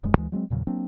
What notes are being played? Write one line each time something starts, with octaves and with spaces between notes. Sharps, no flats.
D#1 F#2 G#3
D2 E3 G#3
F#3 G#3 B3 C4
E2 A#2 C#3 F#3
F#3 A#3 C4 D4